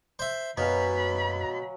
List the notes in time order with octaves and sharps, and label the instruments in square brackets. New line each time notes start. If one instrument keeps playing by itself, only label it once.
[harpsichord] C5 E5
[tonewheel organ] F#2 [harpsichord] B2 [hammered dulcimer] F#3 F5 G#5 [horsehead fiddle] B5